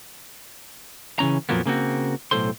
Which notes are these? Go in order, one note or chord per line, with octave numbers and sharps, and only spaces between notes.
C#3 E3 C#4 A#5
F2 A#2 F3 F#3 A#3 B3
C#3 A#3 C4 F#4
B1 A2 A4 C5 C6